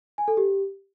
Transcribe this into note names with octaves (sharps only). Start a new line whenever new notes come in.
G#5
A4
G4